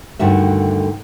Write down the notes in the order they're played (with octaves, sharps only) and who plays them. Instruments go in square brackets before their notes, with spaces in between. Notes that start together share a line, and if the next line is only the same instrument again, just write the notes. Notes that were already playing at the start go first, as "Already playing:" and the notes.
[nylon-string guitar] D2 G2 D3 D#3 F#4 E5